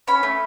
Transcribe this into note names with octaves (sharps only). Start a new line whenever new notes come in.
C#4 B5
A3